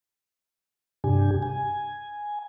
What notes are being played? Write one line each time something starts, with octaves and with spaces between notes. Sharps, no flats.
G2 C3 D4 G4 G#5
G#5